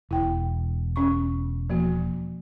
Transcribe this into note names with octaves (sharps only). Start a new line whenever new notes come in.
E1 E4 G5
C#4 C#6
F3 A#3 F#4